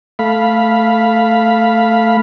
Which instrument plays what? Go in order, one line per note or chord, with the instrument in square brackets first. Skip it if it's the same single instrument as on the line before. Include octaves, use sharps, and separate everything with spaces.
[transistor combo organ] A3 F5 B5